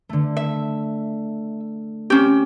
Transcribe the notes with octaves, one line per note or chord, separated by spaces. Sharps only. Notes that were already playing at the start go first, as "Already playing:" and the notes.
D3 A3
E5
C4 C#4 G4